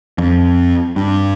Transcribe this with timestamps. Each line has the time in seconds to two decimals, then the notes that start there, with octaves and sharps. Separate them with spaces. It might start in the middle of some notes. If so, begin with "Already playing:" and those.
0.18 F2
0.96 G2